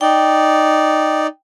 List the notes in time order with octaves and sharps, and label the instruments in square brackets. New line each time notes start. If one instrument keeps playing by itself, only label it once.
[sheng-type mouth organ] D#4 D5 [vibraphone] G5